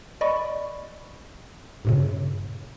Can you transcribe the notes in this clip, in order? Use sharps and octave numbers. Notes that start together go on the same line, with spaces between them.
D5 D#5 B5 C#6
G2 A#2 C#3